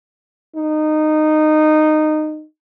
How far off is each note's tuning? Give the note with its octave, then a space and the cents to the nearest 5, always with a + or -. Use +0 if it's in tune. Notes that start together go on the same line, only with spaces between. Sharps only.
D#4 -15